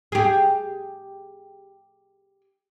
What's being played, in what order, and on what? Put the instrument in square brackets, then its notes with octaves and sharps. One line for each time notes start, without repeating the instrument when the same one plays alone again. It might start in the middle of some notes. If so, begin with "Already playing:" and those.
[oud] G4 G#4